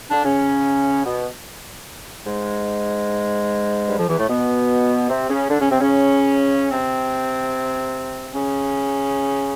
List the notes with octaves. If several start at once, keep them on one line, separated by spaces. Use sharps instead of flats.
D3 D4
C#3 C#4
B2 B3
G#2 G#3
G2 G3
F2 F3
E2 E3
A2 A3
B2 B3
C3 C4
C#3 C#4
D3 D4
C#3 C#4
C3 C4
C#3 C#4
C3 C4
C#3 C#4